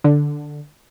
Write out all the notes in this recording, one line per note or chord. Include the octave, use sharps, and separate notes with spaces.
D3